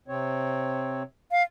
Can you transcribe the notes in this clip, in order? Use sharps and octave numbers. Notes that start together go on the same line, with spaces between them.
C3 C4 C#5
F5